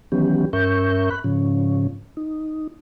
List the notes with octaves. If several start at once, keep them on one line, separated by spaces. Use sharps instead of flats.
D#3 E3 F#3 B3 C#4 G4
G2 C#4 A#4 E5 C#6 G6
B5 F#6
G#2 C#3 F3 C#4
D#4